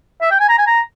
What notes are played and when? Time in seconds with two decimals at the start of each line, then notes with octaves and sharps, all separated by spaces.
0.21 E5
0.31 G5
0.40 G#5
0.49 A#5
0.58 G#5
0.67 A#5